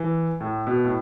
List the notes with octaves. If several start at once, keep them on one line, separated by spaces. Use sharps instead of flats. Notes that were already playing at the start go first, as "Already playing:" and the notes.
Already playing: E3
A2
B2
A2